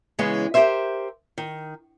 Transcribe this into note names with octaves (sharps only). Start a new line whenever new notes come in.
C#3 E3 G#3 B3 C#4
G4 G#4 A#4 C5 E5
D#3